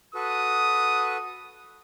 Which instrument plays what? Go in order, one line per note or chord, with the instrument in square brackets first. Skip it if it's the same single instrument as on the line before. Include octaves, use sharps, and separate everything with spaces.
[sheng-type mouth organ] F#4 A4 B4 [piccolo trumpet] D#6